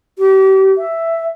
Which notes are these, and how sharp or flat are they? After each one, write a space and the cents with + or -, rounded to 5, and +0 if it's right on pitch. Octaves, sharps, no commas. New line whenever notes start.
G4 -35
E5 +5